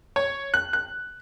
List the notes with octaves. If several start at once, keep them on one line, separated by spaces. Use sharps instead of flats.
C#5
F#6
F#6